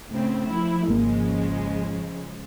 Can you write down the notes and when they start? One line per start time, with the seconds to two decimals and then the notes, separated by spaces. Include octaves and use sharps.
0.10 A2 C#3 C4
0.48 F3 E4
0.88 G#1 C#3 F3 G#3 A#3